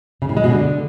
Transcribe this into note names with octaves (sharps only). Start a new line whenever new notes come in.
C#3
A2
G#3
B2
D3